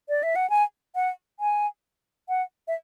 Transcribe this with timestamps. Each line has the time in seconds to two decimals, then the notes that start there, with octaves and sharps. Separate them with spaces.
0.09 D5
0.23 E5
0.36 F#5
0.50 G#5
0.95 F#5
1.40 G#5
2.29 F#5
2.68 E5